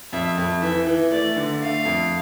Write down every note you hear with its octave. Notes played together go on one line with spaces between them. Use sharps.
F2 E5
F2
E3 E5
E3
A3 D5
D3
A3 F5
F2